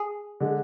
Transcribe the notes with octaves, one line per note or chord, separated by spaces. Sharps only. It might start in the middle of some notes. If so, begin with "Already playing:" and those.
Already playing: G#4
D3 G#3